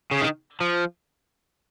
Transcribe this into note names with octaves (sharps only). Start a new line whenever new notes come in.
C#3
D#3
F3